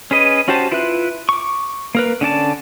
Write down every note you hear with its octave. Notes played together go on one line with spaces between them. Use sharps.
C#4 G#4 B4 D#5
C#4 F#4 G4 C5 A5
E4 F4 B4 E5 F#6
C#6 D6
A#3 A#4 B4
D3 C#4 D5 A5